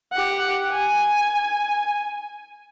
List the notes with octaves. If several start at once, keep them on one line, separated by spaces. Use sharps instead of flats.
G4 F#5
G#5